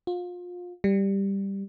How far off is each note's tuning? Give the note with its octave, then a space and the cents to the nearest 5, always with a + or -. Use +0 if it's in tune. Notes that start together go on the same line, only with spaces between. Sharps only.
F4 +30
G3 +5